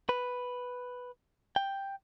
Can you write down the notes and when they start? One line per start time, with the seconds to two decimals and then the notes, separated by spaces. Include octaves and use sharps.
0.09 B4
1.56 G5